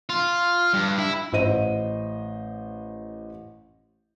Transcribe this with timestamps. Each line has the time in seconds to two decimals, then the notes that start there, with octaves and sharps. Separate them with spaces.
0.09 F4
0.74 G2
0.99 E4
1.32 A1 C5 D#5 D#7